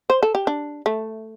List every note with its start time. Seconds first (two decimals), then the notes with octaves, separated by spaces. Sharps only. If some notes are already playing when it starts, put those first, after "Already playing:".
0.10 C5
0.23 A4
0.35 G4
0.47 D4
0.86 A3